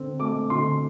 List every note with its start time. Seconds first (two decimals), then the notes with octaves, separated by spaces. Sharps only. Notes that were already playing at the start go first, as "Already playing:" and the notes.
Already playing: D3 C4
0.20 A3 D6
0.50 D3 C6